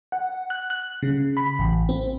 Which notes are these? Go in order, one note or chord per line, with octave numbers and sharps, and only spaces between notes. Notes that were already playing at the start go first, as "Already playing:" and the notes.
F#5
F#6
F#6
C#3
B5
A1
C4